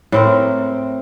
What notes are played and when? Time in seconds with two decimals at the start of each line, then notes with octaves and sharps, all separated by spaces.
0.12 A2 C4 A#4